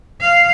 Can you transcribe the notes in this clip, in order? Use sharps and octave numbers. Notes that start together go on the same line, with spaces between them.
F5